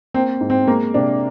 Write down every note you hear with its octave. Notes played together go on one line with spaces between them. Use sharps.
A#3 C4
G#2
C4
G#3 A#3
C3 D4